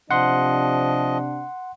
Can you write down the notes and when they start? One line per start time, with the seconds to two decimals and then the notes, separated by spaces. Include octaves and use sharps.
0.11 C3 F3 D4 D#5 F#5 C6